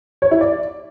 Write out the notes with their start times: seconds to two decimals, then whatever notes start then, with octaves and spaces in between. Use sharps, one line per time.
0.22 C#5
0.31 E4
0.41 D5